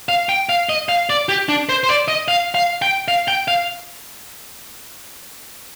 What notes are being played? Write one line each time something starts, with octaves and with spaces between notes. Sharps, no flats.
F5
G5
F5
D#5
F5
D5
G4
D4
C5
C5
D5
D#5
F5
F5
G5
F5
G5
F5